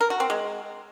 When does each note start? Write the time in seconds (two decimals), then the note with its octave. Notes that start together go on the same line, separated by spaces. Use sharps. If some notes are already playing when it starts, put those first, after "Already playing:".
0.01 A#4
0.10 F#4
0.20 C4
0.30 G#3